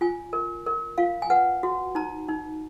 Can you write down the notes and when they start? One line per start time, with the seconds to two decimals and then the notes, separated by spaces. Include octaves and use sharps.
0.01 F4 G#5
0.33 A#4
0.66 A#4
0.98 F4 F5
1.22 G#5
1.30 B4 F#5
1.63 F#4
1.95 D#4 A#5
2.28 D#4